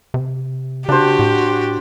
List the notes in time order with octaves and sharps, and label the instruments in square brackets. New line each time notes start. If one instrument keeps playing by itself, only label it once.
[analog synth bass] C3
[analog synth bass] C#3 [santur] D4 C5 [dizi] F#4 [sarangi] G4
[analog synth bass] A2